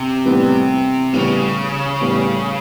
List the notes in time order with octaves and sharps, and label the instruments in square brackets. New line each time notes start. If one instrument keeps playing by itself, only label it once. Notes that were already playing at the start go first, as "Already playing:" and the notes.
Already playing: [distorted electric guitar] C3
[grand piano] A2 E3 G3 B3
[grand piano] A2 E3 G3 B3 [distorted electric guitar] C#3
[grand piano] A2 E3 G3 B3